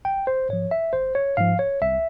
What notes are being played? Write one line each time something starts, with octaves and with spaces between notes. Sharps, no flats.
G#1 G5
C5
G#2 F3 C#5
E5
G#1 C5
C#5
G#2 F3 F5
C#5
C2 E5